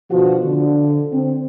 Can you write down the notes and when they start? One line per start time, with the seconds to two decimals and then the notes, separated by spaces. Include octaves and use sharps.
0.11 B2 D3 F3 F#4
0.45 D3
1.13 C4